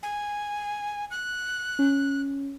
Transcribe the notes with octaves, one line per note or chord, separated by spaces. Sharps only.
G#5
F#6
C#4